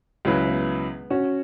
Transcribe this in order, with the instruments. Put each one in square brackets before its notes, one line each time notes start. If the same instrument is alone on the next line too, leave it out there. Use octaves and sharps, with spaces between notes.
[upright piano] C#2 C#3 F#3 E4 B4 [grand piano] G#3
[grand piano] B3
C#4 F#4